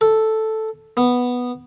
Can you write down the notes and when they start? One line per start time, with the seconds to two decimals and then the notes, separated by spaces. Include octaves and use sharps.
0.01 A4
0.97 B3